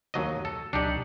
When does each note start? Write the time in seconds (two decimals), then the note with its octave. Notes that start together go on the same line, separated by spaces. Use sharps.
0.14 D#2 F#3 D#5
0.45 A4
0.73 C#2 B2 F#3 D4 D#4 G4